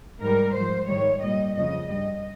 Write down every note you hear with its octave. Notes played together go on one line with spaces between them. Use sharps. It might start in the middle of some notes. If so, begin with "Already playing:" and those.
G#2 G3 A#4
G#2 F3 C5
G#2 D#3 G3 C#5
A#2 G3 D#5
F2 C#3 F3 D#5
G2 G3 D#5